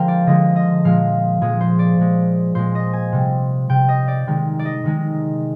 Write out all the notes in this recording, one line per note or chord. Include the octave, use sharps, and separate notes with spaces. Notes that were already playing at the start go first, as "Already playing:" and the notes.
Already playing: D3 F3 G#3 A#4 C5 F5 G5
D5
D3 F3 G#3 D#5
D#5
A#2 F3 G#3 F5
A#2 F3 G#3 G#4
C5
D5
A#2 G#3
A#2 G#3 C5
D#5
G#5
C3 G3
C3 G3 G5
D#5
D5
C3 D#3 G#3
D5
D#5
C3 D#3 G#3